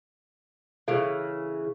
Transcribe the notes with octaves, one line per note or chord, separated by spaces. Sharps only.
C#3 E3 A4 F5